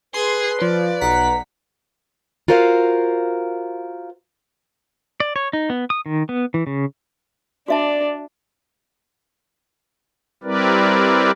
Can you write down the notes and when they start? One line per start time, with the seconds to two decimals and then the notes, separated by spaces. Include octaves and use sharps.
0.14 G#4 B4 C6
0.61 F3 D5
1.01 B1 F#5 A#5 B6
2.48 F4 F#4 A#4 C5 F5
5.20 D5
5.36 C#5
5.53 D#4
5.70 B3
5.90 D#6
6.06 D#3
6.29 B3
6.54 E3
6.67 C#3
7.68 D4 F#4 D5 E5 A5
10.44 G3 C4 E4 A#4 B4 D5